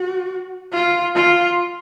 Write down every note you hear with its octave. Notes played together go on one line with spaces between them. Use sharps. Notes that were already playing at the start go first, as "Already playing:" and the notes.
Already playing: F#4
F4
F4